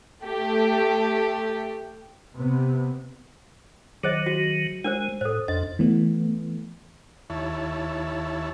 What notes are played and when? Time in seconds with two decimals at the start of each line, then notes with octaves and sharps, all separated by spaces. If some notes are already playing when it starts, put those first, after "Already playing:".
0.25 A3 G4
2.36 C3 B3
4.04 D#3 F#3 G#4 C5 D#5
4.26 F#4
4.84 G#3 D4 A#4 C5
5.21 A2 A4 C5
5.48 F2 D4 D#5
5.79 E3 A3 B3
7.30 D#2 E4 C#5 A5